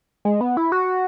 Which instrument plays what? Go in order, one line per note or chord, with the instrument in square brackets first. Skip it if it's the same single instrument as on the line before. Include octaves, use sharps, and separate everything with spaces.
[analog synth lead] G#3
B3
E4
F#4